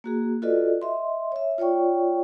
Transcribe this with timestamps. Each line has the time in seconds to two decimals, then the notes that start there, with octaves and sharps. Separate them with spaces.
0.04 A#3 F#4 G#4
0.42 F4 F#4 A4 B4 D5 D#5
0.82 D#5 E5 C6
1.32 C#5 E5
1.58 F4 C#5 D5 G5 C#6